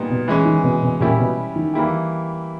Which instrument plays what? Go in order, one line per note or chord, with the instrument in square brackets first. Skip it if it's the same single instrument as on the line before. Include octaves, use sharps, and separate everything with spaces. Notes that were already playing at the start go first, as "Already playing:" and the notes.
Already playing: [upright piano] A#2 G3 B3 D#4
[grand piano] B2
[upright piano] E3 G#3 C#4
[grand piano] D#3
B2
B2
[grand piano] A#2 [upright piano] G3 C#4 E4 G4
[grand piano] B2
D#3
[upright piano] E3 G3 A#3 E4 G4